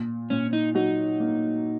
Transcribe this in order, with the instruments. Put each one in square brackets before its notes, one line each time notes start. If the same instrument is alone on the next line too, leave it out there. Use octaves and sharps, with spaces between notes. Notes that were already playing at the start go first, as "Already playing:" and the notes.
Already playing: [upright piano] A#2
[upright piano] A#2 [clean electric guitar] C#4
[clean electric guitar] D#4
[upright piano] F#3 [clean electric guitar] D#4
[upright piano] A#3